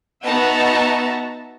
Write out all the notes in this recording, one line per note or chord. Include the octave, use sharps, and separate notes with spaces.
B3 D#4 F#4 E5 A5 A#5